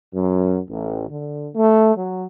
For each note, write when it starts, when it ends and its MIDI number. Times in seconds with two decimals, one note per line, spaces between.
0.14 0.59 42
0.69 1.05 33
1.09 1.48 50
1.55 1.93 57
1.96 2.26 54